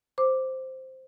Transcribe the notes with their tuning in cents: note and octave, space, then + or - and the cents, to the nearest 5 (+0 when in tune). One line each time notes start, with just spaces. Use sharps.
C5 +0 D6 +0